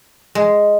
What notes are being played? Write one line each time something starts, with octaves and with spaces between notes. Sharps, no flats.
G#3